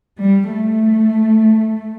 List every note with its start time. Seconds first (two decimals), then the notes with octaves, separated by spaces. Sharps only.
0.22 G3
0.53 A3